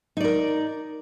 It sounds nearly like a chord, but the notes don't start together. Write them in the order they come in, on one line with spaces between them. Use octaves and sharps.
D#4 D5 A#4